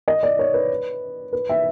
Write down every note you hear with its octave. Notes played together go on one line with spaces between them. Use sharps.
D#5
D5
C#5
B4
B4
E5